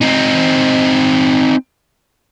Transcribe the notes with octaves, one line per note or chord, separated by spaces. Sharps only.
C4 D#4